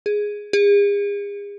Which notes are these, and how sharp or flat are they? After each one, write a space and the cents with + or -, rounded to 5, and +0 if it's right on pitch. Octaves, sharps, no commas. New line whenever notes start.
G#4 +0
G#4 -40